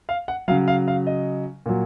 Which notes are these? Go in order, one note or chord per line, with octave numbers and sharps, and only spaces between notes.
F5
F#5
C#3 F#3 F5
F5
F5
D#5
A#2 F#3